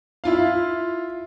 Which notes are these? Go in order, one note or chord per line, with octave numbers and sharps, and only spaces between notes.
E4 F4 F5